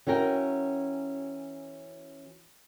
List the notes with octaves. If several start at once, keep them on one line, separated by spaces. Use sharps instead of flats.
E3 C#4 F#4 A#4 G5